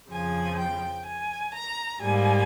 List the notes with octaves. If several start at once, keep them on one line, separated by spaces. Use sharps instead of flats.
F2 C#3 F3 G#5
G5
G#5
A#5
G#2 G3 A#3 G#5